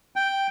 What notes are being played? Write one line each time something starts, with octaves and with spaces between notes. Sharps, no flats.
G5